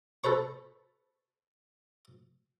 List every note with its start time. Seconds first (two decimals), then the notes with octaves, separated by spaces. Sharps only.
0.24 A4 B4 C5 C#6